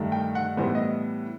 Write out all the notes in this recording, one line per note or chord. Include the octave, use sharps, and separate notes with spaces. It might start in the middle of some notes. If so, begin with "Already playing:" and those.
Already playing: G2 D#3 A3
G5
F#5
A2 E3 G3 B3 C5
D#5